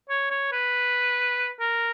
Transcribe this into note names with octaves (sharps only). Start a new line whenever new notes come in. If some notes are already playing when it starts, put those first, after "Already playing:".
C#5
C#5
B4
A#4